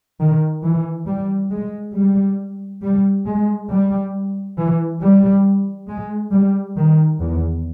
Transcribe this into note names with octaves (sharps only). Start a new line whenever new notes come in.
D#3
E3
G3
G#3
G3
G3
G#3
G3
E3
G3
G#3
G3
D#3
E2